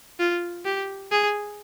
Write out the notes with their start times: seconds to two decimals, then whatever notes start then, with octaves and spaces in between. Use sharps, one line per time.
0.19 F4
0.65 G4
1.11 G#4